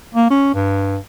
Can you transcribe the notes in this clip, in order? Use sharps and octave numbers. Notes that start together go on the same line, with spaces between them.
A#3
C#4
G2